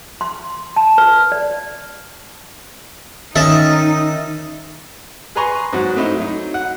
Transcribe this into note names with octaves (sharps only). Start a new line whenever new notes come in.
C6
A5
B4
D5
D#3 C#4 D#4 D#5 E5 A5
G#4 B4 G#5 A#5 C6 C#6
G#2 F#3 F#4
A3 C4 D#4 E4
F#3 D#4
F#5